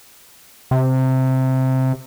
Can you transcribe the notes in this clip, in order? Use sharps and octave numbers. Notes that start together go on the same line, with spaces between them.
C3